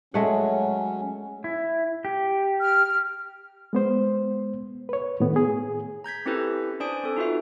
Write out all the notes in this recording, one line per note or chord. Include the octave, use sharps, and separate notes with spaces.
F#3 G#3 A3 C#4 F#5
E4
G4
F6
G#3 B3 C5
B4 C#5
A2 D#3 B3
G#4
A#5 G6 G#6 B6
C4 C#4 E4 G4 A4 B4
D4 C5 D5 G#5 D#6 D7
C4 A4
D#4 F4 F#4 B4 E5